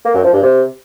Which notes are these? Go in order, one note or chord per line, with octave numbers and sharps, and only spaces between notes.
A#3
F#2
F3
G2
C3